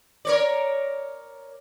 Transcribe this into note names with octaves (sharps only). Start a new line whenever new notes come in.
A#4 C#5 D5